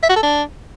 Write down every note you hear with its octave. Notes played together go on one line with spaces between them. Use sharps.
E5
F#4
A4
D4